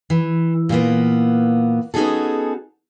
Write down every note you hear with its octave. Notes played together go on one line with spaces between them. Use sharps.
E3
A#2 E3 A#3 B3
B3 C#4 D#4 F#4 G#4 A4